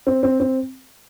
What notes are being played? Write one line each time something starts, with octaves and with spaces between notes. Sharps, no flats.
C4
C4
C4